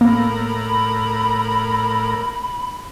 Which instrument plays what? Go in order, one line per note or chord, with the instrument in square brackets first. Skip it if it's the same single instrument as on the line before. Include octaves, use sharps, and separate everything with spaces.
[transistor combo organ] A2 A#4 [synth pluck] A#3 [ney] B5